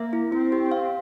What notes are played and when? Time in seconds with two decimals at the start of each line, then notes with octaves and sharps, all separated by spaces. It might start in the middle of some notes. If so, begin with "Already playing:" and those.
Already playing: A#3 E5
0.13 E4
0.32 C4 E4
0.52 G4
0.71 F5